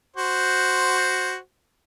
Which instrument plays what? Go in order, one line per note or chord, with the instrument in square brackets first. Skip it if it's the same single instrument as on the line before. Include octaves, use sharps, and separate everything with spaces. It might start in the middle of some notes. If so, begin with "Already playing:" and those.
[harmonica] F#4 C5